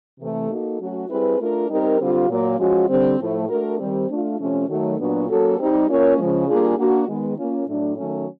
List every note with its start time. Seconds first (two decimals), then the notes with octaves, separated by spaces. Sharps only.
0.20 C3 E3 A3
0.49 A#3 D#4 F#4 A4
0.79 F#3 A3 C#4 F#4
1.09 G3 C4 E4 G#4 B4
1.39 A3 D4 F4 A#4
1.69 G3 C4 D#4 G4 A#4
1.99 D3 G3 C4 F4
2.29 A#2 F#3 A#3
2.59 F3 G#3 C#4 F#4
2.89 D3 G3 C4
3.19 A2 F3 A3
3.49 A3 D4 F#4 A#4
3.78 D#3 G3 C4
4.08 A3 D4 F4
4.38 C3 F3 A3 C#4
4.68 D#3 F#3 A3
4.98 A#2 F#3 B3 D4 F#4
5.28 F#3 A#3 C#4 F#4 A4
5.58 G3 C4 D#4
5.88 A#3 C#4 F4 A#4 C#5
6.18 C#3 F3 G#3
6.47 G3 A#3 D4 F4 G#4
6.77 A#3 D4 F#4
7.07 D#3 G#3 B3
7.37 A#3 C#4 F4
7.67 A2 F#3 A3 D4
7.97 D#3 F#3 A3 C#4